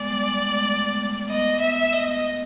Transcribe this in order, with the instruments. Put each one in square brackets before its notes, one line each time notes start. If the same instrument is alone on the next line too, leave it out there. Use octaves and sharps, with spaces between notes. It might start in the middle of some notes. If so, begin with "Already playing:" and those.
Already playing: [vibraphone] G#3 B3 [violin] D5
[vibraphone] G3
G#3
A3
[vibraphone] B3 [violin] D#5
[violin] E5
D#5